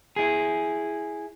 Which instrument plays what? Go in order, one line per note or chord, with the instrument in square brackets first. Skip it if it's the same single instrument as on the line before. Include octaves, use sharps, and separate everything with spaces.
[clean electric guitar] E4 G#4